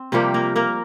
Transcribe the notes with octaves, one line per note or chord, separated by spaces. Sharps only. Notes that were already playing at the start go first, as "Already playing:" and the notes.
Already playing: C4
C3 F3 G3 A#3 G4
A#3 A#4
A#3 A#4